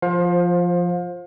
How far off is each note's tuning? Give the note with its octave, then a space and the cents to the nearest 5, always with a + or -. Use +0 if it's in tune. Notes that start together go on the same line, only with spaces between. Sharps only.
F3 +0 C5 +20 F5 +30